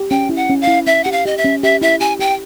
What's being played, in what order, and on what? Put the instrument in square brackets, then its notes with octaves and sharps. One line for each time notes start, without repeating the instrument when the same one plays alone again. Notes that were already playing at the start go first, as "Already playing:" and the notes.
Already playing: [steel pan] G4
[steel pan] C#4 [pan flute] G5
[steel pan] E4
[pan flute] F#5
[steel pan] C#4
[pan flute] F5
[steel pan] E4
[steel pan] C#4 [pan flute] E5
[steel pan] G4 [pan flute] F#5
[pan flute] F5
[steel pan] G4 [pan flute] D#5
[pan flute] E5
[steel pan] C#4
[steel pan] G4 [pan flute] E5
[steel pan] E4 [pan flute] E5
[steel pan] G4 [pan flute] G#5
[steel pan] G4 [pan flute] G5